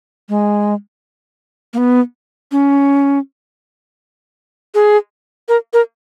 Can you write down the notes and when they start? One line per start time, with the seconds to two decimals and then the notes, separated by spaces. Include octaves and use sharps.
0.29 G#3
1.74 A#3
1.78 B3
2.52 C#4
4.75 G#4
5.49 A#4
5.73 A#4